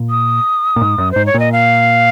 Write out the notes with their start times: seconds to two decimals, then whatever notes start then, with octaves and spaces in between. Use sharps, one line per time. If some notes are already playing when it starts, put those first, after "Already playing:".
Already playing: A#2
0.10 D#6
0.76 A#2
0.81 G#2
0.98 F#2
1.11 G#2 C5
1.26 C#5
1.34 A#2 D#5
1.52 F5